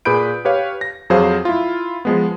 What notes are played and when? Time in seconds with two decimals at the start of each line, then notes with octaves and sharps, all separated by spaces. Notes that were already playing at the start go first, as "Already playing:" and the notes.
0.05 A#2 G#4 B4 B5 G6 D7
0.45 G4 B4 C#5 F5
0.81 A#6
1.10 F2 F#3 G#4 C5 F5
1.45 E4 F4
2.05 F3 G#3 B3